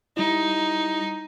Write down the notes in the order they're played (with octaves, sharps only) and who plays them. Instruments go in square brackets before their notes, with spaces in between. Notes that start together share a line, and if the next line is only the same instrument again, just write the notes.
[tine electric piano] G3 E4 [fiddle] D#4